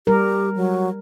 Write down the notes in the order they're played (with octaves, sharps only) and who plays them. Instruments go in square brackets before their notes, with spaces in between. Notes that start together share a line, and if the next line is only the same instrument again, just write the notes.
[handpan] G3 A#4 [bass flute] G4
[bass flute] F#3